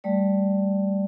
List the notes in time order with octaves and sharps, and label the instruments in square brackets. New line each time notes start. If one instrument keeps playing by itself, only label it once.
[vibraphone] G3 A3 D5